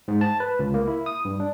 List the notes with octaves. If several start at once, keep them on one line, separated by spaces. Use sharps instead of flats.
G#2
A5
B4
C#2
A#3
E4
D#6
G2
D4